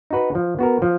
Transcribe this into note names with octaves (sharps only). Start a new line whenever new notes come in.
D#4 F#4 B4
F3
B3 F#4 A#4
F3